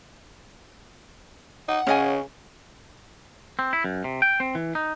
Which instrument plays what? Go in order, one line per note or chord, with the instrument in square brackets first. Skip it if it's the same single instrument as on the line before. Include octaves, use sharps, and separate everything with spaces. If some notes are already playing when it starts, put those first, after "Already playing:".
[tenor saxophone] D#4 [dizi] F#5
[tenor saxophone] C#3 [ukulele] C#4 D#5 G#5
[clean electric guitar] C4
E4
F#2
C3
G5
C4
E3
D#4